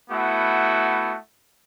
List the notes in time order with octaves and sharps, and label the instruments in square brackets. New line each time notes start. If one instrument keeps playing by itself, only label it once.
[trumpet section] A3 B3 E4 F#4